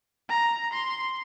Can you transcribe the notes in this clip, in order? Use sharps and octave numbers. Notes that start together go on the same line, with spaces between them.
A#5
C6